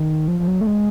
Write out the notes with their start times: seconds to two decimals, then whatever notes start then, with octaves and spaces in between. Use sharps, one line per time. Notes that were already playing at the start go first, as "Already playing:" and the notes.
Already playing: D#3
0.28 F3
0.39 F3
0.47 F#3
0.61 A3
0.67 G#3